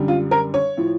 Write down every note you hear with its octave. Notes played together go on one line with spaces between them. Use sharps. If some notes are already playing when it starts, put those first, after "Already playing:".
Already playing: F#2 D3 G3
F4
A#4
C#5
A2 F3